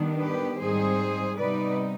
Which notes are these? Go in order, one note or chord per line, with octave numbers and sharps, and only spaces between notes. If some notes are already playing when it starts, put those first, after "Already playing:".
Already playing: D#3 G3 B3 D4
G4 B4
G#2 G3 C4 D#4 G#4 C5
C3 G3 B3 D#4 B4 D5